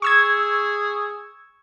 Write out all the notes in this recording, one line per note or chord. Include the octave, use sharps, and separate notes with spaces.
G#4 C#6 E6 G#6